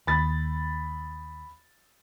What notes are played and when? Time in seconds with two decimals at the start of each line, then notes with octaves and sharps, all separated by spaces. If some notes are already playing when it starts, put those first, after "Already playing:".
0.07 D#2 B5 A6